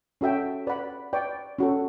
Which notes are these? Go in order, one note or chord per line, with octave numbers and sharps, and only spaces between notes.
C#4 F#4 A4 E5 G5
B4 D5 F#5 B5
B4 D5 G5 C#6
C#4 F#4 A4